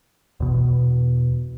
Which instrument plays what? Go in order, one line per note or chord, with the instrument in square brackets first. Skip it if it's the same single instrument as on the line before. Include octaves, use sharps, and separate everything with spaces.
[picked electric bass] E2 B2